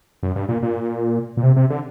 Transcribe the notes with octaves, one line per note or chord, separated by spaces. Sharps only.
F#2
G2
A#2
A#2
A#2
C3
C3
D3